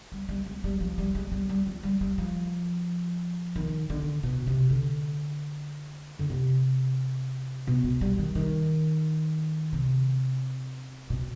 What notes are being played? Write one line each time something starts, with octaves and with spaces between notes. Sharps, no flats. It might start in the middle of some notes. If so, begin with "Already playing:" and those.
G3
G3
G#3
G3
F3
G3
G#3
G3
G3
F3
G3
G3
F3
D#3
D3
B2
C3
D3
D3
C3
B2
G#3
G3
D#3
D#3
C3
B2